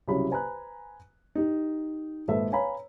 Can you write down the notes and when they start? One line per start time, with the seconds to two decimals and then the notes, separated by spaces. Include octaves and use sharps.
0.08 C2 C#3 F#3 E4 B5
0.30 B4 C5 G#5 A#5 B5 F#6
1.35 D#4 G4
2.28 G#1 A#2 A4 B4 E5
2.52 B4 C#5 F5 G#5 A#5 B5